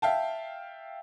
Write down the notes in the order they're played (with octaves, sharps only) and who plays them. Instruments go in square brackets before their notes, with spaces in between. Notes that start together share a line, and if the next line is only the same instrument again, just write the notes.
[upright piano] E5 F5 G5 A5